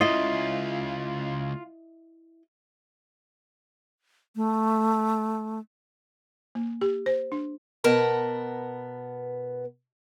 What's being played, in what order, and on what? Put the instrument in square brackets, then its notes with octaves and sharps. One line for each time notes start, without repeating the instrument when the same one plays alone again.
[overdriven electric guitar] C#2 C#3 [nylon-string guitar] E4 D#5 [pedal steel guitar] F4
[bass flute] A3
[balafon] A#3
G4
C5
D4
[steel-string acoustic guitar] B2 B3 A#4 A5 A#5